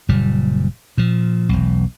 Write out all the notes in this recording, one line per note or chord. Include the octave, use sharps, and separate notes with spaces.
F#1 A#2 G3
A#2 F3
E1 B1